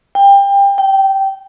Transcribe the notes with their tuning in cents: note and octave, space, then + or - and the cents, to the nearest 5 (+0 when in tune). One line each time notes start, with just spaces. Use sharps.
G5 +25
G5 -15